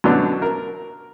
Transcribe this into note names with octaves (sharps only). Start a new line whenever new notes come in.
F#2 B2 D3 F#3 D4
A#4